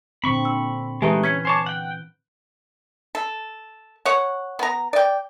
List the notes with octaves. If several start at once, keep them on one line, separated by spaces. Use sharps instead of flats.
A#2 D3 C4 B5 C#6
E6
E3 G#3 A3 D#4 G4 B4 E5 A#5
C#4 G#6 B6 C#7
C5 C#5 G#5 A5 D6
F#5 G5 F#6
A4
C#5 F#5
B3 A#5
D5 G5